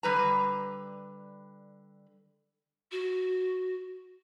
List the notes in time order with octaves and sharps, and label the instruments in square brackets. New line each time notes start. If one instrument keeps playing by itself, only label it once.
[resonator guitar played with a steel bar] D3 G3 B4 A#5
[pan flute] F#4